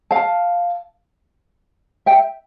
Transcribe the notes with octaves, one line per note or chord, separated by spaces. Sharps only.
F5 A5
E5 G5